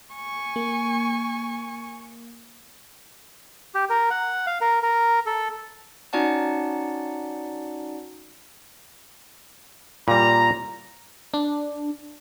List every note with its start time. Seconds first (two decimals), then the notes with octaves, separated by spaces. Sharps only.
0.14 G#5 C#6
0.56 A#3
3.75 G4
3.90 A#4
4.11 F#5
4.47 F5
4.61 A#4
4.83 A#4
5.26 A4
6.13 C#4 D#4 F#4 D5 F#5 A5
10.08 A#2 G3 A#5
11.34 D4